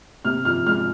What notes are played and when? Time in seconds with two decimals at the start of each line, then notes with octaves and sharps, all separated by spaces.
0.25 C3 F6
0.45 F3 F6
0.66 G#3 F6